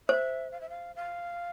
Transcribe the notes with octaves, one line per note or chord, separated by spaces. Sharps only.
C5 E5
F5
E5
F5
F5